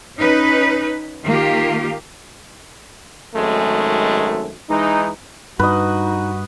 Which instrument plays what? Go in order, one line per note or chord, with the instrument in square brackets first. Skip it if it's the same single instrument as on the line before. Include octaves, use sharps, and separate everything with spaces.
[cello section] C#4 D#4 B4
D#3 A#3 F4 G4
[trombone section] G#1 F#2 D#3 G#3 A3
E3 G#3 D#4
[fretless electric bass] G2 [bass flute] D#4 [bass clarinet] F#4 [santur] B4 D#5